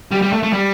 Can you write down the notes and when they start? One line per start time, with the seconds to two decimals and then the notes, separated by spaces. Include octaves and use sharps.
0.12 G3
0.22 G3
0.33 A3
0.43 A3
0.53 G3